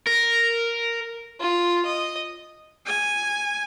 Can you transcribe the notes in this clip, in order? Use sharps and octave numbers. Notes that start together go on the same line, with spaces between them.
A#4
F4
D#5
G#5